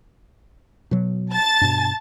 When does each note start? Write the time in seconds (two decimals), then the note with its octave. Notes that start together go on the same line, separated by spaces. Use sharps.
0.91 B2 F#3
1.33 A5 A6
1.61 G2 B2